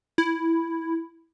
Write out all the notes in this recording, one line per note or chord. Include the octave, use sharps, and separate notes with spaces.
E4